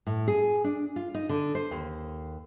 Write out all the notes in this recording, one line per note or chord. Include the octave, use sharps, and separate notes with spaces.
A2
G#4
D4
F4
D#4
D3
C5
D#2